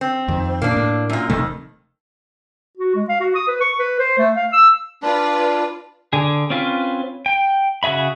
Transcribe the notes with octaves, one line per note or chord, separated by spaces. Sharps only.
C4
F2 D#3
A#2 A#3 D4
A2
F#2 A#2
D#1 F2 C3 D#3 A3
F#4
G#3
F5
F#4
D#6
B4
C#6
B4
C5
A3
F5
E6
D4 F4 B4 D5
D3 G#4
C4 C#4 F4 B4
G5
C#3 F#4 G#4 E5 B5